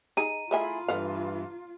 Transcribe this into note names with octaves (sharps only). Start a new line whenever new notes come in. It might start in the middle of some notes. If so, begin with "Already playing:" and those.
D#4 G#4 A#5 D#7
A3 E4 F4 G#4 E5 G#5 B5
G2 E3 A4 B4 F5